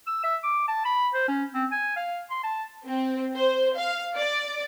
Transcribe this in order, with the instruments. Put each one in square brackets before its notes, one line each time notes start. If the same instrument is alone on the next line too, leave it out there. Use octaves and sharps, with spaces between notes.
[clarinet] E6
E5
D6
A5
B5
C5
C#4
C4
G#5
F5
C6
A5
[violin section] C4
C5
F5
D5